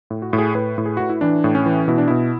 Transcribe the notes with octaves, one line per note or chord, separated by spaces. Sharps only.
A2
F#4
A2
G#4
A2 B4
A2
G#4
A2 F#4
E4
E3 D4
A2
C#4
E3
B2 E4
D4
B2 E4